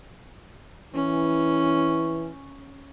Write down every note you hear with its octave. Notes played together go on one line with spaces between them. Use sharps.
E3 C#4